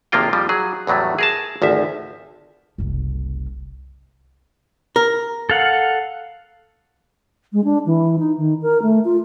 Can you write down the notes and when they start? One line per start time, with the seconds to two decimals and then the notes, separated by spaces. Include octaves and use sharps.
0.12 G#1 C3 F3 A#3 F4 G5
0.33 F2 F3 G3
0.49 F#3 G#4
0.87 E2 A2 F#3 G3 A3
1.19 G#4 A#4 A5
1.62 G#1 D2 F3 E5
2.78 F#1 C2
4.96 A#4
5.49 A4 F5 F#5
7.53 G#3
7.64 D4
7.86 E3
8.19 D#4
8.38 D#3
8.62 A#4
8.82 A3
9.05 F4